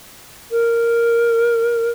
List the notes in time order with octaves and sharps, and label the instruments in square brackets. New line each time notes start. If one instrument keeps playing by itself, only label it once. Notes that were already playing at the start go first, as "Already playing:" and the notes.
[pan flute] A#4